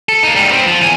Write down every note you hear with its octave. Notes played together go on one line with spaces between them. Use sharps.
A4
A#3 D#4
G#2 G3
B3 C4
F3
E2 G#5